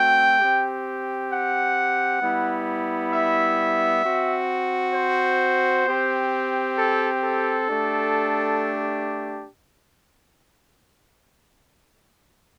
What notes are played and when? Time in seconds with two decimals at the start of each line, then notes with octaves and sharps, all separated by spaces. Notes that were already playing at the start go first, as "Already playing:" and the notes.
Already playing: A3 C4 F#4 G5
0.40 C4 G4
1.31 F#5
2.21 G3 B3 E4
3.12 E5
4.03 C4 F#4
4.94 C5
5.86 C4 G4
6.76 A4
7.22 A4
7.67 A3 D4 G4